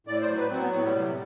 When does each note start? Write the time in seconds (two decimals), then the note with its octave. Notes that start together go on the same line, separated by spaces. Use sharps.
0.07 A2 D5
0.21 C5
0.29 F#3
0.36 B4
0.50 F#3 C4
0.62 B3
0.72 A2 B3
0.84 G3
0.95 C3